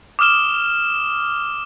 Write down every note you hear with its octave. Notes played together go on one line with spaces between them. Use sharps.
D6 D#6 F6 E7 G7